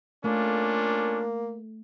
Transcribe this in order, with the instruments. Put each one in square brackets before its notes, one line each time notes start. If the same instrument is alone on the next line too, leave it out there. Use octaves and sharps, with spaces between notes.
[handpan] A3 [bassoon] A#3 [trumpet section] C#4 D4 F4